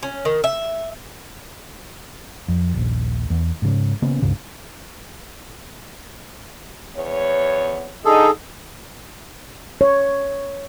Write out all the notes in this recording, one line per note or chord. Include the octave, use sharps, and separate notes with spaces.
C#4
D#3
E5
F2
D#1 A#1
E2
G#2 C#3
C#3 A#3 B3 C#4
C#2 G2 C#3
E2 B3 C#5
D3 D#4 G#4 A4
C#5